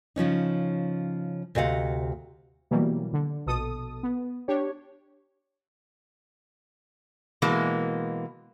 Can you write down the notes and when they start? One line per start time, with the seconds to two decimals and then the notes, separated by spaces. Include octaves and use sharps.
0.16 C#3 F3 C#4 D#4
1.55 D2 C3 D#5 F5 F#5
2.71 B2 E3 F#3 G3 A#3
3.13 D3
3.46 A#1 B2 A4 D#6
4.03 B3
4.48 D4 G4 C#5
7.42 B2 E3 G#3 A#3